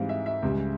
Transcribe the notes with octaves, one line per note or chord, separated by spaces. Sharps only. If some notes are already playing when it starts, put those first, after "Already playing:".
Already playing: G#2 E3 G3 C4 F5
E5
E5
C#2 C#3 G3